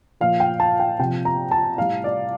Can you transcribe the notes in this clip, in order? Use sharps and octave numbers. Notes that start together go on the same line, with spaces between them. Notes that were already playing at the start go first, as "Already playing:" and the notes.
A#2 F3 F5
G5
A5
G5
C3 F3 G5
A#5
A5
A2 G3 F5
D5